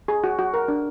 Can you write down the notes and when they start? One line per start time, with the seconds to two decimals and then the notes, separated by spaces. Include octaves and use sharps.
0.08 G#4
0.24 F#4
0.39 F#4
0.54 A#4
0.68 D4